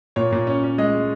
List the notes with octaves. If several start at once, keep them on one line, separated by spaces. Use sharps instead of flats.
A#2 C#5
A#2
C#4
C#4
G#3 D#5
G#3